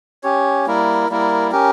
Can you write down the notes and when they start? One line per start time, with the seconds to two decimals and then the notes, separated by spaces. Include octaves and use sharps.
0.23 C#4 G4 C#5
0.67 G3 A#3 E4 A#4
1.09 G3 A#3 E4 A#4
1.51 C#4 G4 A#4